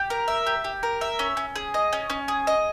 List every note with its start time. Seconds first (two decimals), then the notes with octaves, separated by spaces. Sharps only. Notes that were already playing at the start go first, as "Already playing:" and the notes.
Already playing: G4
0.10 A#4
0.28 E5
0.47 G4
0.64 G4
0.83 A#4
1.01 E5
1.19 C#4
1.37 C#4
1.56 G#4
1.74 D#5
1.93 C#4
2.10 C#4
2.28 G#4
2.47 D#5